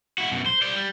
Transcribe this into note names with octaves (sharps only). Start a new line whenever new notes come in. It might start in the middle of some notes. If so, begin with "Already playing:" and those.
E4 F#4
F#2 B2
C5
C5 D5
G3